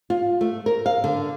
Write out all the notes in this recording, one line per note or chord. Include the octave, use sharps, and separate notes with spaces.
F4
A3
A#4
F5
D3